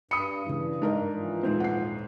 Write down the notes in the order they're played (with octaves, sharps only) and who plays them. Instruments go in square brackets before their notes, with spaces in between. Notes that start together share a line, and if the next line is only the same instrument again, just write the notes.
[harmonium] G2 [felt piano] B5 D#6 [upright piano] C#7
[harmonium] G2 [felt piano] C#3 E3
[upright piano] G#2 [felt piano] D4 A#4 D#5
[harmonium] E3 F3
[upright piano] D#1 G#2 C4
[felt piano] F#5 C7